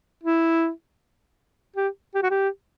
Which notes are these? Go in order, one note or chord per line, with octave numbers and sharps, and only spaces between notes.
E4
G4
G4
F#4
G4